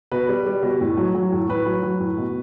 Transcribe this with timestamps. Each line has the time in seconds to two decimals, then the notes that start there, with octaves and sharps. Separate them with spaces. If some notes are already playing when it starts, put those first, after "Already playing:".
0.12 B2 B4
0.29 G3
0.46 G3
0.63 B2
0.81 A2
0.97 F#3
1.15 F#3
1.32 A2
1.49 A2 B4
1.66 F#3
1.83 F#3
2.00 A2
2.18 B2